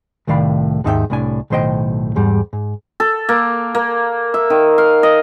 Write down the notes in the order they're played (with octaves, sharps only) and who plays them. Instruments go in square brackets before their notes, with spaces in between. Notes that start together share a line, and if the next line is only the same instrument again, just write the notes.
[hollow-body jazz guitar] C2 A2 D#3 D5 F5 B5
D#2 G#2 D#4 F#4 E5 G5
C2 A2 D4 G#5
B1 A2 D#3 C5 D#5 G5
E2 G#2 G3
G#2
[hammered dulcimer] A4
A#3
A#3
E5
D#3
F5
D#5